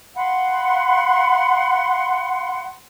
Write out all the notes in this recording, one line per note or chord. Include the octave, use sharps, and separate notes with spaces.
F5 F#5 B5 C6